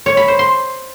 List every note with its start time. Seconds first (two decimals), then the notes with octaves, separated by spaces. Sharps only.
0.06 C#5
0.17 B5
0.28 C5
0.39 C6